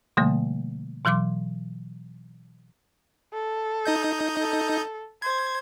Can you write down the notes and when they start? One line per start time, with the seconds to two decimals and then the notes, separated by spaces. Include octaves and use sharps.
0.17 B2 D3 F3 G3 A3 A#3
1.05 B2 E3 F#3 C6 D6
3.33 A4
3.85 D#4 D#5 G6
4.40 A4
5.22 C5 G#6